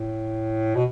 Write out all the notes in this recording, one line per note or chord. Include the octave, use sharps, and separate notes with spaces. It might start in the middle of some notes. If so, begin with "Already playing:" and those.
Already playing: A2
B2